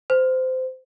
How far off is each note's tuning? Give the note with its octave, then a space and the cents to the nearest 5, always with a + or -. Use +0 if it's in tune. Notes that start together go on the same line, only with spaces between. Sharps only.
C5 -20